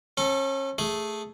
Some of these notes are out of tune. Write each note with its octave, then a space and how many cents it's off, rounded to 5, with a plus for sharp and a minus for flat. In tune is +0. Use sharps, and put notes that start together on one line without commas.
C#4 -35 A4 +0
A3 +0 G#4 +0